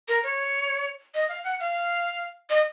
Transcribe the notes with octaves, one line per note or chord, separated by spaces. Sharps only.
A#4
C#5
D#5
F5
F#5
F5
D#5